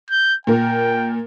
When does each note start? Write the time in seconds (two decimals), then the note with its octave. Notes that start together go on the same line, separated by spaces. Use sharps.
0.11 G6
0.47 A#2 A#4 G5